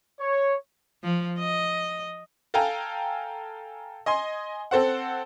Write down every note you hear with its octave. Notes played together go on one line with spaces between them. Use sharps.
C#5
F3
D#5
A4 F5 G5 G#5 A#5
D#5 G#5 C6
C4 A4 C5 F#5